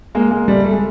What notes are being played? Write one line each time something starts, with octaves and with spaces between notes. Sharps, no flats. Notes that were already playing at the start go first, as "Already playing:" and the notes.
G#3 A#3
G#3 A#3
G3 A3
A3
G#3